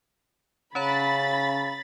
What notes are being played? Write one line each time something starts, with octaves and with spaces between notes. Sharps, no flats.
C#3 C#4 C#5 A#5 B5 A6